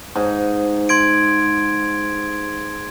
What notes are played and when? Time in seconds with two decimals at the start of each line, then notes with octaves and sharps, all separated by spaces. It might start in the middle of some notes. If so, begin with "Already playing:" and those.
0.15 G#2 D#4
0.89 C6 G#6 D7